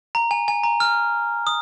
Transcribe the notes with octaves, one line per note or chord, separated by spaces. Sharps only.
A#5
G#5
G#5
A#5
F6
D#6